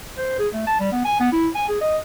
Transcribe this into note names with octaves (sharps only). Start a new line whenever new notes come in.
C5
G#4
A3
A5
G3
B3
G#5
B3
E4
G#5
G#4
D#5